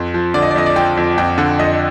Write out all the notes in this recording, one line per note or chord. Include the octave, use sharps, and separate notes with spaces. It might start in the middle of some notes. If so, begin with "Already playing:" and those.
Already playing: F2
F3
D3 D5
D#5
D5
F2 D#5
D5
F3 G5
F2
F2 G5
D3
F2 D#5